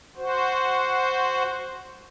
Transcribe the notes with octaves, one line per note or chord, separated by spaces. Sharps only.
F#4 C5